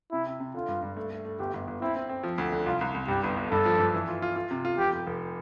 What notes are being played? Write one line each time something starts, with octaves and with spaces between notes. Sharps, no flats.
C3 E4
C3
C3
D3 F4
G2
G2
A3
A3
A3
G1 G4
G1
G1
C4 E4
C4
C4
F3
D2
D3
C2 F4
C2
C2
G2 G4
G1
G1
G2 A4
F3
G2
E3
F4
F4
F4
C3
F4
F1 G4
F1
F1